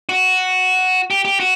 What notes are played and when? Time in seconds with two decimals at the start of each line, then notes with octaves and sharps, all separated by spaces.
0.09 F#4
1.10 G4
1.25 G4
1.40 F#4